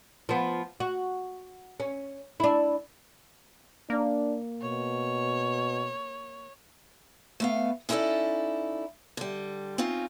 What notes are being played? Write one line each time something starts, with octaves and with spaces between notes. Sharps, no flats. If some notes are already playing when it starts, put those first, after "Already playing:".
F3 B3
F#4
C#4
D4 E4
A#3 D4
B2 C#5
A3 B3 F5
C#4 D#4 E4 G#4 A4 D5
D3 G3
C4 C#4 D#4 F4